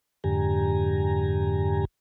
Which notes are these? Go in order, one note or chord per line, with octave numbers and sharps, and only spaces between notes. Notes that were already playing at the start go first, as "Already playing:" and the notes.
F2 G#2 D3 G4 G#5 A#5